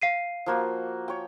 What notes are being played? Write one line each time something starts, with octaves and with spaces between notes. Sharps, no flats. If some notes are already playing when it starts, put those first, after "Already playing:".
F5 C7 D#7
F3 A#3 F#4
C#5 G5